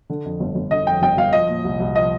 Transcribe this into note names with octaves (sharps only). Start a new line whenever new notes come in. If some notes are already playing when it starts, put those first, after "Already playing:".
D3
F2
G1
G1
D3 D#5
F2 G5
G1 G5
G1 F5
F3 D#5
A#2
C2
C2
F3 D#5